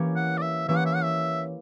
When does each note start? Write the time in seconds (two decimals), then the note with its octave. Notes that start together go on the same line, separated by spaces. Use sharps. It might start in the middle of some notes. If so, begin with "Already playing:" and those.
Already playing: E3 A#3 C#4 G4 C#5
0.16 F#5
0.38 D5
0.42 E5
0.68 E3 A#3 C#4 G4 C#5 E5
0.77 F#5
0.86 E5
0.95 F#5
1.03 E5